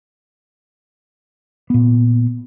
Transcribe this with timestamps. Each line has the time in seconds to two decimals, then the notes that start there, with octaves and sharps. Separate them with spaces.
1.70 A#2 B3